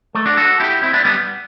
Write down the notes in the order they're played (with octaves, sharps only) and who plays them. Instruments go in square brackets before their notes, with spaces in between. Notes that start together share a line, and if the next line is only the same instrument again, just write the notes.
[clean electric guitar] A3
D4 F#4
F#4 A4
E4 G4
C4 E4
B3 D4
G3 B3